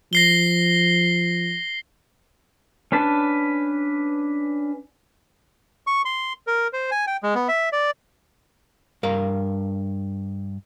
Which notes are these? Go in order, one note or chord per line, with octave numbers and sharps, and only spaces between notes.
F3 A#6 C7 G7
C#4 D4 B4 A5
C#6
C6
A#4
C5
G#5
G5
G#3
B3
E5
D5
G2 A#4 F5